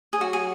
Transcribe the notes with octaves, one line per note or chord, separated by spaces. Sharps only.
G#4
F#3 F#4
G#4